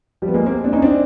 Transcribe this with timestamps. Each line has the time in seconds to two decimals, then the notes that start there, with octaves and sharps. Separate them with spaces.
0.22 F3 G3
0.28 B3
0.34 G#3 A#3
0.46 A#3 C4
0.64 C4 D4
0.73 C#4 D#4
0.82 C4 D4